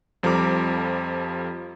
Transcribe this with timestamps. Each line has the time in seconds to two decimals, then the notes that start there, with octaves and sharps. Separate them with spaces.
0.23 F2 F3 G3 A4 A#5 D6